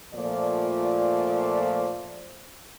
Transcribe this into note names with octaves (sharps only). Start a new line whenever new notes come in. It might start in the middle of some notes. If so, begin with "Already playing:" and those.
A#2 F3 A3 D5